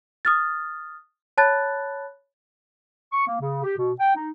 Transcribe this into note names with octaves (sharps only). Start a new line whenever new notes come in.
D#6 F6 A6
C#5 A5 B5 F#6 A6
C#6
A#3
C#3
G4
B2
G5
D#4